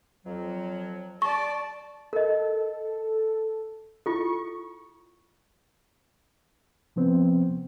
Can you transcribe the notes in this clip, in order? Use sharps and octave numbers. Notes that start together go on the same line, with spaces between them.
F2 F#3
D5 A5 C#6
A4 A#4 D#5
E4 F4 A4 C#6
C3 F3 B3 C4